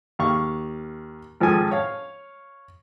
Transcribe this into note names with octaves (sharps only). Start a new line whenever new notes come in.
D#2 F5 C#6
G#1 F3 G#4 A4 G#5
C#5 F5